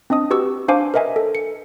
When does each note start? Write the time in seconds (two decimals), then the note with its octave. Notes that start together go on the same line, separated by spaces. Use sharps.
0.10 C4 D4 D#5 D#6
0.31 F#4 G4 B4 C#6 E6
0.68 D4 C5 F5 G#5 D6
0.94 A#4 B4 D#5 E5 G#5
1.16 A4
1.35 C#7